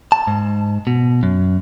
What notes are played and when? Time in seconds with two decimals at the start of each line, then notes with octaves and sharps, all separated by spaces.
0.12 A5
0.27 G#2
0.87 B2
1.23 F#2